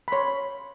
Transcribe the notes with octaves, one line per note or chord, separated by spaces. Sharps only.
B5
C#5 C6